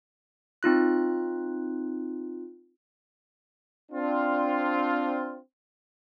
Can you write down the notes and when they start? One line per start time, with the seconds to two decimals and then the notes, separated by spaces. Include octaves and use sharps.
0.63 C4 D#4 F4 F#6
3.92 C4 D4 F4